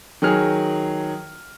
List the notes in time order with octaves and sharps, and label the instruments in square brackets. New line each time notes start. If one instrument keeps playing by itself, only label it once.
[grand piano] D#3 F#3 G#4 F6